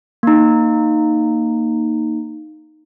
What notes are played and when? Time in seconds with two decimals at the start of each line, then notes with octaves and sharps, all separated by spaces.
0.23 A#3 D#4